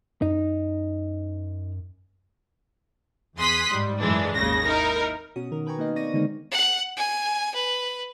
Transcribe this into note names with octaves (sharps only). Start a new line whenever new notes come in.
F#2 D#4
E2 G#4 C6 D#6 F#6 B6
G#2 G3
F#2 A2 E3 G#3 D4
G#1 D#2 C#3 A#6
D#4 E4 A#4
B2 C#4 F#4 D#6
B2 D#3 A#4
A#4 B4 G5 G#5 A#5 C#6
A#3 B3 D#4 B4 D#5 F5
B3 C4 D5 C#6 A#6 D#7
D3 D#3 G#3 A#3 C4 D#4
F#5
G#5
B4